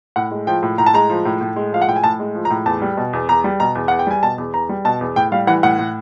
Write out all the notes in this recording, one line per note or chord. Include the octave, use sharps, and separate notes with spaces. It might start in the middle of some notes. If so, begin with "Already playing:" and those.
A2 F#5
G#3
F3 G5
A2
A2 A#5
A5
G#3 A#5
F3
A2
A2
G#3
F3 F5
F#5
A2 G5
G#5
A2 A5
G#3
F3
A#5
A2
E2 A5
G3
B2
E2
E2 A#5
G3
B2 A#5
E2
E2 F#5
G5
G3 G#5
B2 A5
E2
E2 A#5
G3
B2 A5
E2
A2 G5
G3 F5
E3 F#5
A2 F#5
A2